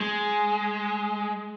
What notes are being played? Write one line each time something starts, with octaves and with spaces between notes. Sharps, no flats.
G#3